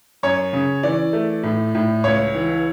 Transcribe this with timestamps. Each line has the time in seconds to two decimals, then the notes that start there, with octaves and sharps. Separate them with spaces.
0.23 F#2 C#5
0.53 C#3
0.83 E3 D5
1.13 A3
1.43 A2
1.75 A2
2.04 C#2 C#5
2.35 E3